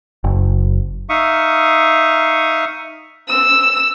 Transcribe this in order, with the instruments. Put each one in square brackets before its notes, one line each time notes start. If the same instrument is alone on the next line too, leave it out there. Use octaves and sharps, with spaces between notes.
[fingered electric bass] F#1
[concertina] D#4 E5 F5 C#6 D#6
[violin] E6